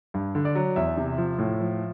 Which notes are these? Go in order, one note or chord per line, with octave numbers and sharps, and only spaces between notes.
G2
D3
D5
F#3
E2 E5
C3
F3
A2
F3